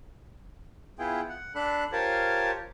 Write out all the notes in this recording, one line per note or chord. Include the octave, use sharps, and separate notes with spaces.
B3 E4 F4 G#4 G5
F#5
D4 A4 B5 F#6
F4 G4 A#4 C5 C#5 A5